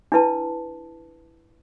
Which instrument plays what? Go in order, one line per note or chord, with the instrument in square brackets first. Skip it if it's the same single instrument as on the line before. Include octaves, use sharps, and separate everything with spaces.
[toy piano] D4 E4 B4 A5